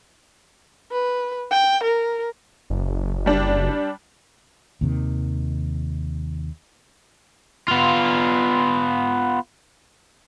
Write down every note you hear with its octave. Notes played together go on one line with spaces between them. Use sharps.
B4
G5
A#4
F#1
G3 D4
D#2 C3 D#3
B3 F4